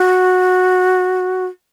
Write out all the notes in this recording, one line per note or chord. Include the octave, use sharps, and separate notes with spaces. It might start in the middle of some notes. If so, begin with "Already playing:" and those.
Already playing: F#4